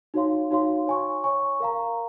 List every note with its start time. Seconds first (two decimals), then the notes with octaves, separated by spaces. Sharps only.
0.14 D#4 F#4 C#5 F5 C6
0.51 D#4 F#4 C#5 F5 C6
0.87 C#5 G#5 C#6
1.24 C#5 G#5 C#6
1.60 A#4 F5 A#5